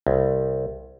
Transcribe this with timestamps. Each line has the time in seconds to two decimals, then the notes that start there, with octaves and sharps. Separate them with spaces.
0.07 C2